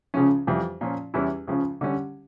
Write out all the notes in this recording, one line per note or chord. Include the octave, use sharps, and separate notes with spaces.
C#2 C#3 F3 C#4
F2 E3 G3
A#2 F3 C#4
E2 E3 G3 C#4 E4
C#2 C#3 F3
D3 G3 C#4